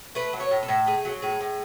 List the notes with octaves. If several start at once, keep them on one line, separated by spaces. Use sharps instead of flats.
A3 B4
F#3
C#5
A2
A4
A2
A3 G#4
F#3
A2 G#4
A2